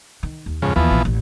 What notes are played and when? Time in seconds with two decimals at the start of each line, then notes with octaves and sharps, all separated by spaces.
0.23 D#3
0.46 D#2
0.62 F2 G#2 C#3
0.76 D#2 E3 F3 B3
0.91 A#1
1.05 A1